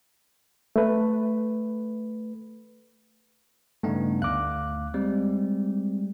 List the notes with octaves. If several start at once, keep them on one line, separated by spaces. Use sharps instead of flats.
A3 B4
G2 C#3 A3 B3 D#4
D2 F5 D6 F#6
G3 G#3 C4